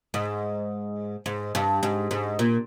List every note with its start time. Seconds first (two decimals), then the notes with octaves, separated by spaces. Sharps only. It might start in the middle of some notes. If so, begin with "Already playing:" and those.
0.14 G#2
1.26 G#2
1.55 G2
1.83 G#2
2.11 G#2
2.39 A#2